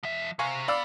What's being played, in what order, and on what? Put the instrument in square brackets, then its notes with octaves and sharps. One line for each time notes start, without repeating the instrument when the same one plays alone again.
[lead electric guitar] F3 E5
[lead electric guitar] C3 [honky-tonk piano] F5 G#5 C#6
[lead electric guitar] B3 [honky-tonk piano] D5 F5 E6